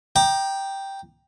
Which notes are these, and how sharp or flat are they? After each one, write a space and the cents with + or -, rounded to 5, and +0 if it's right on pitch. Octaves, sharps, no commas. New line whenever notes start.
G5 +0 A#5 +15 D6 +40